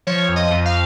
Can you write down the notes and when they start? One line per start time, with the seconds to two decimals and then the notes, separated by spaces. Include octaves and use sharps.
0.07 F3 C#5
0.29 F2
0.36 D#5
0.51 F2
0.65 F5